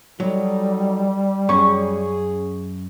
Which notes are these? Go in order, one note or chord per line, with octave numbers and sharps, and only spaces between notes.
F#3 G3 D#4 F#4 A4
F#2 C#4 G#4 C#6